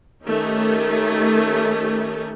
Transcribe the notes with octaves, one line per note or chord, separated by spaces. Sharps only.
D#3 A3 C#4 D#4 G4